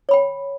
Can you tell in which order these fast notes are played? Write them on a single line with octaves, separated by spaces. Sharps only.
C#5 B5 G5